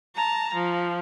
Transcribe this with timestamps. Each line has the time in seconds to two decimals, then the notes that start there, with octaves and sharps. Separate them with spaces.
0.15 A5 A#5
0.54 F3